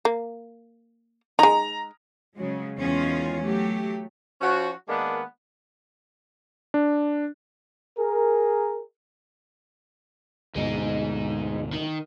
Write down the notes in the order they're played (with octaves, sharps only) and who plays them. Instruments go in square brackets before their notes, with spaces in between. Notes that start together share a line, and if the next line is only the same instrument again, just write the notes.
[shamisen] A#3
[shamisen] G#3 D#4 [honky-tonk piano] A#5
[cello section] C#3 F#3 G#3
E2 D#3 G#3 C#4 F4
F#3 A3 G4
[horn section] F3 C#4 F#4
D#3 G#3 A#3 B3 D4
[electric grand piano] D4
[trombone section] G#4 A#4
[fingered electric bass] D2 G#2 B2 [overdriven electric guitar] G#3 D#4
[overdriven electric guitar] D#3